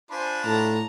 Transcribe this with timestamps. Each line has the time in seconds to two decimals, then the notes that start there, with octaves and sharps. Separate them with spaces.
0.11 D4 F4 C5 G#5 B5
0.45 A2 A5 A#5